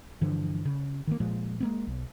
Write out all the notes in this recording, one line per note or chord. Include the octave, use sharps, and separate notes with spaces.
G2 D3 E3 F3
C#3
D#3 E3 A#3
A#2 F3 G#3
G#3 A#3 C4
B1